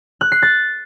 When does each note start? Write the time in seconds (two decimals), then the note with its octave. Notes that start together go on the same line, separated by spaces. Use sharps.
0.21 F#6
0.32 C7
0.42 A6